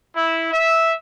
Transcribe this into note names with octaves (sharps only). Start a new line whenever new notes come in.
E4
E5